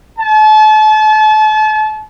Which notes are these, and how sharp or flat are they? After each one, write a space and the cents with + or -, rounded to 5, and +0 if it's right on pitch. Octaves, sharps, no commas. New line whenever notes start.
A5 -35